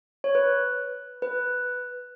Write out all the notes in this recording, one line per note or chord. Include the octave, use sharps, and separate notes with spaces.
C#5
B4
B4